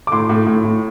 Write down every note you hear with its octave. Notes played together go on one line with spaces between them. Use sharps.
D6
A2 C6
A2
A2
A2